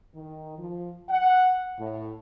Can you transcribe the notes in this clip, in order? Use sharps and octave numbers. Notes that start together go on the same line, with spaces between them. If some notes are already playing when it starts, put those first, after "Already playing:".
D#3
F3
F#5
A2